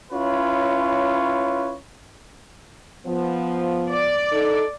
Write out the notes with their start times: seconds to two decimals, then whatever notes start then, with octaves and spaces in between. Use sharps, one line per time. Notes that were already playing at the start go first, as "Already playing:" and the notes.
0.12 C#4 E4 F4 B4 C#5
3.06 F3 B3
3.90 D5
4.31 D#4 A4